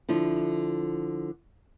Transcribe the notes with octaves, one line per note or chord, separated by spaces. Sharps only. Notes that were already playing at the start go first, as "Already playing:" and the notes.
D3 F3 E4